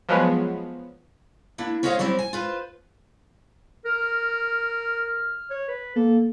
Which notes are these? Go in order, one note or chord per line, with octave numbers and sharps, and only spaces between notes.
F3 F#3 G#3 B3
A#3 D4 E4
C#4 F#4 C5 C#5 D#5 F5
F#3 G3 C4 E4 C5
G#5
F4 B4 C5
A#4 F6
C#5
B4
A#3 A4